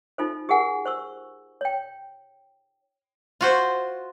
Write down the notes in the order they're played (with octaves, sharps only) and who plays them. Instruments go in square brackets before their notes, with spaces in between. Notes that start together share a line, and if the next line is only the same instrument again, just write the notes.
[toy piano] D#4 F4 A4 C5
G4 G#4 A#4 F#5 G#5
C5 C#6 E6
C#5 G5
[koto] F4 F#4 C5